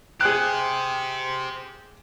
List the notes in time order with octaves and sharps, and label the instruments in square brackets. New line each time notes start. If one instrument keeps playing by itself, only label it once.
[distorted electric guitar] G4 C5 [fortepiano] G#4 F#6